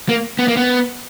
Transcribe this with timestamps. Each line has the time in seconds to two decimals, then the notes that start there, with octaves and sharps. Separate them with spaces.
0.09 A#3
0.39 B3
0.48 A#3
0.57 B3